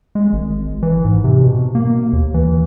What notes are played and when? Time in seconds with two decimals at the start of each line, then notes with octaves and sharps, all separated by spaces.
0.15 G#3
0.33 G#1
0.83 E3
1.05 G#2
1.24 C3
1.43 B2
1.75 A#3
2.13 D#2
2.34 E3